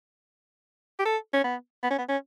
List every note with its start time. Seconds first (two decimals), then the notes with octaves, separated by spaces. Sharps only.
0.99 G4
1.05 A4
1.34 C#4
1.44 B3
1.83 B3
1.91 C#4
1.98 B3
2.09 C#4